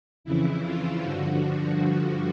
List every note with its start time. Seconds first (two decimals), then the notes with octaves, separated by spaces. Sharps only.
0.24 F2 C#3 E3 E4
0.64 F4
1.02 G2 D3 F3 F#4